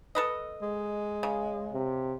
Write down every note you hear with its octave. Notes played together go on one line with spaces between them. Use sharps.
A4 B4 D#5
G#3
C#3
C3